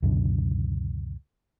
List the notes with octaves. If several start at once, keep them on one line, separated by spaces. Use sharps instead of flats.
C#2 F#2 B2 D3